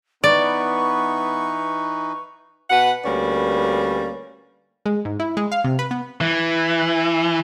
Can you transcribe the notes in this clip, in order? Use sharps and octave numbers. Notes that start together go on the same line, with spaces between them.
E3 B3 D#4 B4 D5 C#6
B2 B4 F#5
D2 G3 A#3 C#4 B4 D5
G#3
G#2
E4
G#3
F5
C3
B4
B3
E3